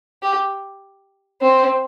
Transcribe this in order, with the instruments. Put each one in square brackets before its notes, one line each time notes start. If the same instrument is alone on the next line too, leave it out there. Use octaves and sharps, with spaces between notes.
[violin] G4
C4